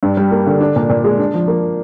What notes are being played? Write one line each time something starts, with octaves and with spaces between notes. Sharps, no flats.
G2
G3
A#3
D3
D4
A#2
A#2
G#3
D4
F3
A#3